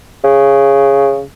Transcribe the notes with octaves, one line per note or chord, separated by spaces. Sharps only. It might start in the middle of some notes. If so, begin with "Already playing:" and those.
C#3